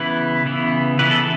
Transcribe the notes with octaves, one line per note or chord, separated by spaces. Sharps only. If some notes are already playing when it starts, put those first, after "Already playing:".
Already playing: C#3 E3 B3 E4 B4
C#3 E3 B3 E4
C#3 E3 B3 E4 B4
A4